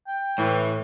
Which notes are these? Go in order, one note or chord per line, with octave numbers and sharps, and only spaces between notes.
G5
A2 E3